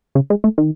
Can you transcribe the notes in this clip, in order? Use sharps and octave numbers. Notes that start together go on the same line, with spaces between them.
C#3
G#3
A3
D#3